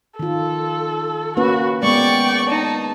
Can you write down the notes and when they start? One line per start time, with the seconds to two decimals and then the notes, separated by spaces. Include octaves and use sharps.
0.19 D#3 F4 A4
1.37 A#3 C#4 F#4 B4
1.83 G#3 B3 D5 G5 C#6
2.49 D#4 A5